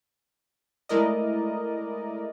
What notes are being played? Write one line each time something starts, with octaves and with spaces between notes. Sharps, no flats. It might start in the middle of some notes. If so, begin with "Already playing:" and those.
G#3 A3 E4 A#4 D5 D#5